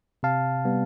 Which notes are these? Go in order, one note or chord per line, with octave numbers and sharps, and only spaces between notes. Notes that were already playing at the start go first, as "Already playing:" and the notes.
C3 F5 A5
G3 B3